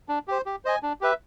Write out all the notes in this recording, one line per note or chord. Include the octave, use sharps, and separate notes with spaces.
D4
G4 C5
G4
C5 D#5 G#5
D4
G4 B4 E5